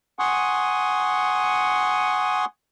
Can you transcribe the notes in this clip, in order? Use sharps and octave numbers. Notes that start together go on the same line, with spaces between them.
F#5 G#5 C6 C#6 D#6